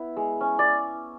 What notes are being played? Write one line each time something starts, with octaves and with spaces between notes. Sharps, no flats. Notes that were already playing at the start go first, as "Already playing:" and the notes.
Already playing: B3 E4
G#3
C#4
D5